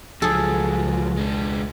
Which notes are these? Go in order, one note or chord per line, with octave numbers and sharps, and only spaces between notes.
C#2 F3 F#3 G#4 A4
G#3 D4